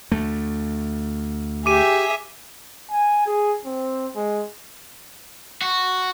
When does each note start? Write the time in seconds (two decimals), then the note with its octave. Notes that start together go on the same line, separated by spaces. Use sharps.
0.12 D2 A3
1.66 G4 G#4 E5 D6 D#7
2.91 G#5
3.26 G#4
3.65 C4
4.15 G#3
5.61 F#4